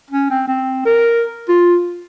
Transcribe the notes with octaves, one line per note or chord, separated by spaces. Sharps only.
C#4
C4
C4
A#4
F4